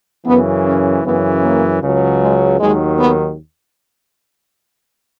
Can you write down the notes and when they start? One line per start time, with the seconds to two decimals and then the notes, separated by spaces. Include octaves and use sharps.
0.25 F#2 C#3 E3 B3
0.65 C#4
1.04 F#2 C#3 E3 B3
1.42 A#3
1.81 C#2 C#3 F#3
2.21 G#3
2.59 D#2 D#3 F#3 G#3
2.99 B3